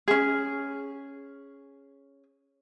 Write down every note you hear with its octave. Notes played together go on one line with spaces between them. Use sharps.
C#4 G#4